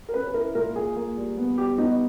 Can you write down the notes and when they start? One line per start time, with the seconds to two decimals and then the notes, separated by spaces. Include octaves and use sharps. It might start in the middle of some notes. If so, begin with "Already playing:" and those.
0.09 A#4
0.14 C#4 B4
0.27 B4
0.34 E4 A#4
0.55 A#2 A#4
0.76 A#2 G#4
0.96 A#3
1.17 G3
1.37 B3
1.58 G3 G4
1.78 B3 D#4